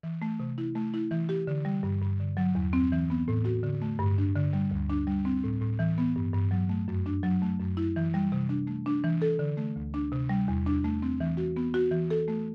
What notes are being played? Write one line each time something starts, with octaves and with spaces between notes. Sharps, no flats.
E3
A3
C3
E4
A3
E4
E3
G4
D3
G3
G2
G2
D3
F#3
E2
C4
E3
B3
A2
F#4
D3
A3
G2
D4
D3
G3
D2
D4
G3
C4
A2
A2
E3
B3
G2
G2
F#3
A3
F#2
D4
F#3
A3
F#2
E4
E3
G3
C3
D4
A3
D4
E3
A4
D3
A3
D2
D4
C3
G3
E2
D4
A3
C4
E3
F#4
B3
F#4
E3
A4
A3